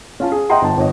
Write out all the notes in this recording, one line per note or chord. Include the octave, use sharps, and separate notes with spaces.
C#4 F4 A5
G#4
D#5 E5 F#5 G5 A#5 C6
G1 A5
G1 C#5 D#5